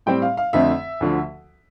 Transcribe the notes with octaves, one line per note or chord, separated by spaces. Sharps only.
A2 G3 C4 G5
F5
F5
F2 D3 A3 C4 E5
D2 D3 F3